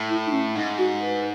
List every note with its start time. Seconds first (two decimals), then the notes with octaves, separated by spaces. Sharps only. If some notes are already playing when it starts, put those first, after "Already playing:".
Already playing: A2
0.09 E4
0.26 D#4
0.32 C#4
0.55 G#2 D#4
0.78 F#4
1.00 B4